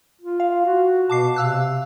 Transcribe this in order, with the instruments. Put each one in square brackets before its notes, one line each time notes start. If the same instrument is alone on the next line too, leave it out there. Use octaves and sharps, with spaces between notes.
[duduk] F4
[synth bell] F5
[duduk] F#4
[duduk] B2 [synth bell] A5 D6 C7
[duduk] C3 [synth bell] F5 E6 F#6